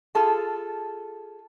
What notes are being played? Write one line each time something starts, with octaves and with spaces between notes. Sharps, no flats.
F4 G#4 A4 A5